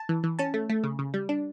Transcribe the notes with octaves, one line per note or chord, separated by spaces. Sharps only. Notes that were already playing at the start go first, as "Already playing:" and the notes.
Already playing: A5
E3
E3
C#4 A5
A3
A3
C#3
C#3
G3
D4